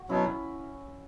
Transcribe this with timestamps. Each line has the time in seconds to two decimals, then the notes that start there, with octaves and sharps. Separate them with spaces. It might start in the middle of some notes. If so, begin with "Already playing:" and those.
Already playing: F#4
0.09 B2 F#3 C#4 E4